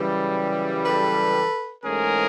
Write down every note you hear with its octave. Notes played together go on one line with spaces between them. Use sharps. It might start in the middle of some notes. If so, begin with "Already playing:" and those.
Already playing: F#2 C#3 E3 G3
A4 B4
G#2 E3 A3 C#4 G#4 A#4